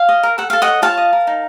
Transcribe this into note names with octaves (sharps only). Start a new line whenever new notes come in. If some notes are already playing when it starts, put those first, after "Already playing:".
Already playing: F5
D#5
A#4
A4 F#5
A4 F5
D#5 F#5
C#5
F4 F5 A5
D#5
A#4
D#4